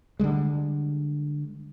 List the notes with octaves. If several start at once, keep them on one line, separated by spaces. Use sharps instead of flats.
D3 D#3 G3 G#3